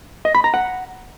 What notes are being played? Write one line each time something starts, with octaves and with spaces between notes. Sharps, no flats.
D#5
B5
A#5
F#5